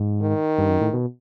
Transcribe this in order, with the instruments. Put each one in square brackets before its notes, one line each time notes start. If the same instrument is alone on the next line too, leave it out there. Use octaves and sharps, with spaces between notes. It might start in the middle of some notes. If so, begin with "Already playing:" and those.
Already playing: [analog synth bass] G#2
[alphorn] D#3
[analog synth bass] G2
F#2
A2
B2